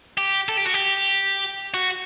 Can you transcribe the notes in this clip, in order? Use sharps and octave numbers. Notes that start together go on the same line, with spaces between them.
G4
A4
G4
F#4
G4
F#4